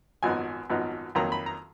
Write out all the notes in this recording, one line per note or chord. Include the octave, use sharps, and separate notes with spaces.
G#1 F#2 F3 B3 D#4 G#5
G#1 F#2 F3 B3 D#4
F2 D#3 F#3 A#3 A#5
B5
A#5